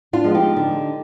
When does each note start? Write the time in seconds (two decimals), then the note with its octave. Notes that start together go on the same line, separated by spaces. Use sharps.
0.13 D4 F4
0.24 F3 G#3 B3
0.35 D#4 G4
0.56 D3